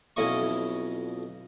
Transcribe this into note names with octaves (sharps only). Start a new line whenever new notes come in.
B1 F2 C#4 E4 D#5 C#6